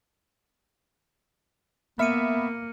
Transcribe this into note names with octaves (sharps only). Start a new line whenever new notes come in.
A#3 B3 E5 B5 F6 C#7 D#7